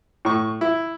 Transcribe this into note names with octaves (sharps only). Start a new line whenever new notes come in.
A2 C#6
E4